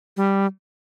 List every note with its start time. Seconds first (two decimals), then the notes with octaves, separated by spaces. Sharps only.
0.17 G3